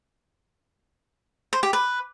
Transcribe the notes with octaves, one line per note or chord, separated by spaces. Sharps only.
C5
G4
B4